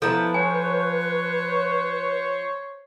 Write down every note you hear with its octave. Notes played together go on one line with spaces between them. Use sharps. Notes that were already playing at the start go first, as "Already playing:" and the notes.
F3 B3 E4 A4 B4 A5 A#5
C5 C#5 G#5